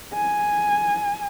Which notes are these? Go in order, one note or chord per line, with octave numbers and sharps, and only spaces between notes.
G#5